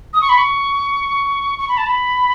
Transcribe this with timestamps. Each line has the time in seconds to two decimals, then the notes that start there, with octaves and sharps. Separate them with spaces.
0.13 D#6
0.21 C#6
0.29 B5
0.38 C#6
1.59 C#6
1.69 B5
1.77 A5
1.86 B5